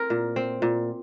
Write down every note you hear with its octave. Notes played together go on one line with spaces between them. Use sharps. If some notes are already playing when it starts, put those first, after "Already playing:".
Already playing: C4 A#4
A#2
C4
A#2